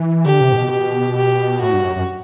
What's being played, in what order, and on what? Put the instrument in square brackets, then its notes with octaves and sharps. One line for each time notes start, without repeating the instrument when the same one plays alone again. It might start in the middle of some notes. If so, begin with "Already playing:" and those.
Already playing: [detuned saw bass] E3
[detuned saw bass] D3 [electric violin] G4
[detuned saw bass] C3
A2
B2
[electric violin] G4
G4
[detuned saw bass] A2 [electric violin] F#4
[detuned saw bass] G2
F#2
F#2